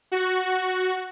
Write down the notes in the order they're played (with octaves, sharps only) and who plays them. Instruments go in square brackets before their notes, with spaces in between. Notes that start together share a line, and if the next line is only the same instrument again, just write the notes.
[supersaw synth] F#4